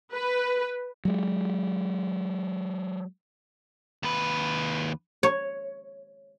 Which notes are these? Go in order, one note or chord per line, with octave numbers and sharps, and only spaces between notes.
B4
F#3 G#3
D#2 B4
C#5